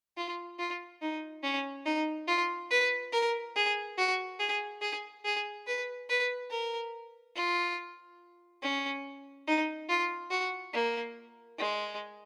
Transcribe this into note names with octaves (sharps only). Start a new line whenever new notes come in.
F4
F4
D#4
C#4
D#4
F4
B4
A#4
G#4
F#4
G#4
G#4
G#4
B4
B4
A#4
F4
C#4
D#4
F4
F#4
A#3
G#3